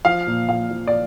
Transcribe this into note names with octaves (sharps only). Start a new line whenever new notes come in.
F3 F5
A#2
A#2 F5
F3
D5